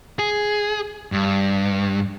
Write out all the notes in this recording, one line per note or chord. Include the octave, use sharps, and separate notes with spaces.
G#4
G2